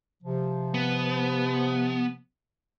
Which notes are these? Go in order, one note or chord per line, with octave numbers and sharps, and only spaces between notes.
C3 F3
B3